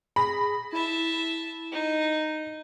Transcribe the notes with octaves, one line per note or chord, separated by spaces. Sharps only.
G#4 B5 A#6
E4 E5 A5
D#4